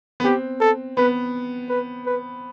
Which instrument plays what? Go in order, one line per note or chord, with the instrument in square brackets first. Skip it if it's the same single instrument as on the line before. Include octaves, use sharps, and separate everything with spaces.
[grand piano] B3
[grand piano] C4 [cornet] G4
[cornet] A4
[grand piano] B3 [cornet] B4
[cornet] B4
B4